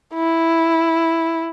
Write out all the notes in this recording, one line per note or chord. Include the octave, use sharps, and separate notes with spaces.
E4